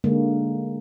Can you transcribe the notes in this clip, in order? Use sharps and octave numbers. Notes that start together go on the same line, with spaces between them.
D3 G#3 A#3